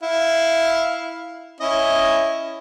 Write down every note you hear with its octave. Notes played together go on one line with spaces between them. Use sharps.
E4 F5
C#4 E4 D#5